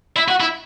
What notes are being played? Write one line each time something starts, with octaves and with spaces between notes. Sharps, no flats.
E4
F#4
E4